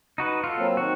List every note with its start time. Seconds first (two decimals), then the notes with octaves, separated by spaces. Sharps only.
0.18 D#4 F#4 B4
0.44 F4 A4
0.58 F#3 A#3 C4
0.77 D#3 C4 F#4